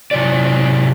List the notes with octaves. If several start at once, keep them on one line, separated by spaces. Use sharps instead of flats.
C3 F#3 D5